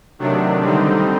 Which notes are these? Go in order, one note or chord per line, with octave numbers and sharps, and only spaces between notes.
C3 D#3 F#3 A3 D4
D3 G3 C4 D#4